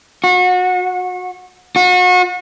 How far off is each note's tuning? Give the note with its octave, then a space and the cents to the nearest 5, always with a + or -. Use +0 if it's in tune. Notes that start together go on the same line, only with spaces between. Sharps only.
F#4 -30
F#4 -35